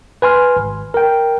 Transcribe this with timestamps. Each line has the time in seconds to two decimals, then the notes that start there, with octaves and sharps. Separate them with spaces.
0.22 B4 G#5 C6 F6
0.56 G#1
0.94 A#4 G5